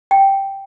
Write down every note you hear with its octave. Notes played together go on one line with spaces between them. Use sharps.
G5